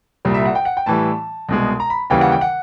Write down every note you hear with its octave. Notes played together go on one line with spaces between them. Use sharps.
C2 A#2 G3
E5
F#5
G5
F#5
G5
A2 E3 G3 A5
C2 B2 G#3
A#5
B5
D#2 C#3 E3 G3 G5
F#5
G5
F#5